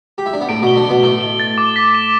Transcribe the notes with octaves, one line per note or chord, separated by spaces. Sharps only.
G4
E4
D4
B3
A2 A3 D7
B2 B3 G7
D3 D4
B2 B3 G7
A2 A3 G7
G7
A6
D6
B6
E7